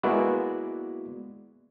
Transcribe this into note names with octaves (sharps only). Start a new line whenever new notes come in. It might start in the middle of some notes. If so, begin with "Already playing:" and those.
G#3 A#3 B3 E4 F#4 D5